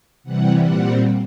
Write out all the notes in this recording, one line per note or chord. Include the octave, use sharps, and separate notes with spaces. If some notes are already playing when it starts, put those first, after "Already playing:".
C3 E3 G3 F#5
A#2 G3 C4 F#5